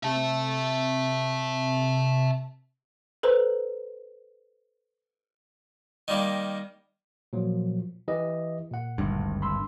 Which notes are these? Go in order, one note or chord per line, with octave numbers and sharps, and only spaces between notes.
C3 E5 A5
A4 B4 C5 A#5
D#3 G3 A#3
A#2 F3 F#3
E3 G4 D#5
A#2 F#5
G#1 D2 G2
B5 C6 E6